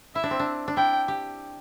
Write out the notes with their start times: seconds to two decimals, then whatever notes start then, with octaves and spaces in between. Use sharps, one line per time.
0.15 E4 E5
0.23 D4
0.31 C4
0.39 D4
0.68 D4
0.77 E4 G5
1.08 G4